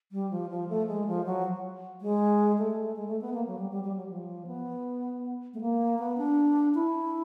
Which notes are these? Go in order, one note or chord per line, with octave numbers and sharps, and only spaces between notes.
G3
F3
F3
A3
G#3
F3
F#3
G#3
A3
G#3
A3
B3
A#3
F#3
G3
G3
G3
F#3
F3
B3
A3
A#3
B3
D4
E4